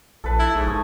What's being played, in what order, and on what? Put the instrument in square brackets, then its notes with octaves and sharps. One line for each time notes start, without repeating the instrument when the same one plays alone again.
[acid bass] A#1 [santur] A4 B4
[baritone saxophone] E4
[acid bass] A#1 [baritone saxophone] G#2
[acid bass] G1 [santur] A3 D#4 G#5